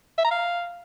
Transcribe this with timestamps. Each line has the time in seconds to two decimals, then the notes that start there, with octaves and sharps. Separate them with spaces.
0.18 E5
0.24 A#5
0.31 F5